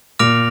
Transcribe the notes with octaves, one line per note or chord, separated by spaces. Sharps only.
A#2 D6 F6 A#6 D7 F7